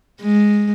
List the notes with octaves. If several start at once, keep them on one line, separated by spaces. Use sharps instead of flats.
G#3